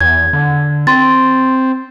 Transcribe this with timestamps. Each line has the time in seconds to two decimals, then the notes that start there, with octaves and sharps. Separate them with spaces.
0.01 E2 G#6
0.33 D3
0.87 C4 C6 A6